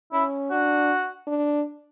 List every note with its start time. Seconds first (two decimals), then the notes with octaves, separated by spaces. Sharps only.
0.13 C#4 E4
0.51 D4 F#4
1.27 D4